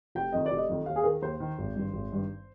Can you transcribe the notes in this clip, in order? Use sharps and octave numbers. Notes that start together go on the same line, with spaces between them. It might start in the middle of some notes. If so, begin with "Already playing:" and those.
F1 G5
F2 D#3 D#5
D5
F1
D#5
F2 D#3
D#2 F5
G#4
D#3 A#4
D#2 C5
D#3
G#1
G2 D#3
G#1
G2 D#3